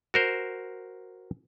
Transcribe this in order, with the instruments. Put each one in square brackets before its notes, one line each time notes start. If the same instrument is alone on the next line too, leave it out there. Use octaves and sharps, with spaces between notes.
[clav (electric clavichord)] F#4 A#4 C5